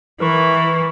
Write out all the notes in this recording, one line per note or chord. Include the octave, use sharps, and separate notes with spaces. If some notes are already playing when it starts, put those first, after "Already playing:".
E3 A#4 B4 C#6